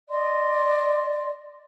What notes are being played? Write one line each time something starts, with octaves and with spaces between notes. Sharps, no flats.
D5 D#5 C6